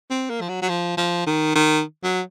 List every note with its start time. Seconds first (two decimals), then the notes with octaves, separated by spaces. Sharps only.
0.10 C4
0.29 A#3
0.41 F3
0.49 F#3
0.62 F#3
0.69 F3
0.97 F3
1.27 D#3
1.55 D#3
2.03 F#3